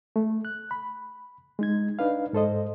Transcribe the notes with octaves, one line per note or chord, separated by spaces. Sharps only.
A3
F#6
B5
G#3 D#4 G#6
D4 D#4 B4 F5
G#2 A4 C5 D#5